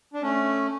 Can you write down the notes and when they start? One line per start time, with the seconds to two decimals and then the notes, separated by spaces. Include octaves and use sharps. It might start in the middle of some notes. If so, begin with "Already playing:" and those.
0.14 D4
0.22 A3 C#4